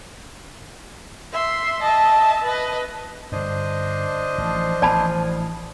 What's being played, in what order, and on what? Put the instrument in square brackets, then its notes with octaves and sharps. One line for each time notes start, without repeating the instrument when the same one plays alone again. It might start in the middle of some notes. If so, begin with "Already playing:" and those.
[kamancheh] E5 C6
[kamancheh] D#5 E5 [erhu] A5
[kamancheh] B4 D#5
[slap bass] G2 D3 [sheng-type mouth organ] D4 C5 D#5
[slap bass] A1 [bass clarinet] F3
[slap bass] A1 [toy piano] D5 A5 B5